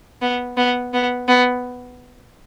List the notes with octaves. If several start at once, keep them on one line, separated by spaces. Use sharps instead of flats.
B3
B3
B3
B3